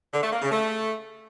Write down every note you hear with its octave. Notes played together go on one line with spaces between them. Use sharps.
D3
A3
A#3
C#3
A3